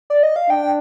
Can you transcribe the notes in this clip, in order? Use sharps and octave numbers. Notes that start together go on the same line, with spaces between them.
D5
D#5
F5
D4 G5